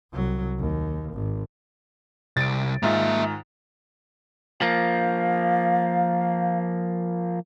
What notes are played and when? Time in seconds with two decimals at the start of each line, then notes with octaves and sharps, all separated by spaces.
0.13 C2 F#3
0.59 D#2
1.13 G#1
2.37 C2 A6 D7
2.83 G#2 D#3 A#3 F4 E5
4.62 F3 A#3 F5